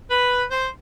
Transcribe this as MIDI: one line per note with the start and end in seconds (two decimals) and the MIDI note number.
0.10 0.44 71
0.51 0.69 72